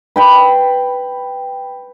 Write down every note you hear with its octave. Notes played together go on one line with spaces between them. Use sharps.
B4 G5 B5